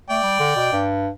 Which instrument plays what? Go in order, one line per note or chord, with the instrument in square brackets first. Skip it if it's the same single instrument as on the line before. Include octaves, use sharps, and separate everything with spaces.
[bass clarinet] A3 [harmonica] D5 G5
[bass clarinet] G3
D3
B2
G2